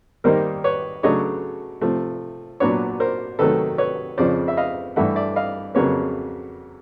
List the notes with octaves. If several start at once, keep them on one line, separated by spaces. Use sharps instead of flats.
D#3 G3 A#3 D#4 A#4 C5
B4 C#5
C#3 F#3 A3 D4 C#5 D#5
C3 F3 A3
A#2 F#3 B3 D4 B4 C#5
A#4 C5
C3 D#3 F#3 A3 A4 B4
B4 C#5
F2 C#3 F3 C5 D5
E5
D#5 F5
G2 E3 A3 E5 F#5
D5 E5
D#5 F5
F2 C#3 F#3 A#3 B4 C#5